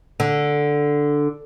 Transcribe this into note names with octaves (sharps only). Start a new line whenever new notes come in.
D3